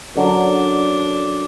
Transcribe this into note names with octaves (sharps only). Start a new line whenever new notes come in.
F#2 D3 F#3 D4